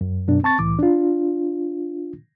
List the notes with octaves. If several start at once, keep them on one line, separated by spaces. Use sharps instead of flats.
F#2
F#2 B2 D4
C4 A5 C#6 A6
C2 A2 E3 D6
D4 F4